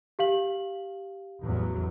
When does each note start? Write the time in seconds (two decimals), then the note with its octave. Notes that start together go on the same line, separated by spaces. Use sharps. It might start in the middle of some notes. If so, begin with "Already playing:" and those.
0.19 G4 F5 F#7
1.42 A1 E2 F#3